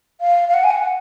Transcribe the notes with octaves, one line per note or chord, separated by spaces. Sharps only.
F5
F5
F#5
G#5
F#5